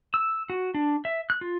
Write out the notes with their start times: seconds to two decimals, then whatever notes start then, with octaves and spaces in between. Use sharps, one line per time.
0.14 E6
0.50 F#4
0.74 D4
1.05 E5
1.30 F#6
1.41 F4